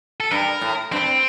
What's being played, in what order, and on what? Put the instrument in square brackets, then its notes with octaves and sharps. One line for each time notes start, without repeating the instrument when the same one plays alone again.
[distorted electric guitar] A4
[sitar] G2 [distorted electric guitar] A#4
[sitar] A2
[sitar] G2 [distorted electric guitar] C4